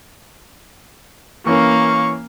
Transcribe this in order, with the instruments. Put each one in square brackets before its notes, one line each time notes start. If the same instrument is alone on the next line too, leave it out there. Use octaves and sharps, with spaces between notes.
[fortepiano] E3 C#4 A#4 [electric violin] A#3 F5 [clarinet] C#6